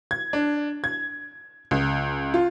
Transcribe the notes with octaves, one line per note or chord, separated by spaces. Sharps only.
G#6
D4
G#6
C#2
F4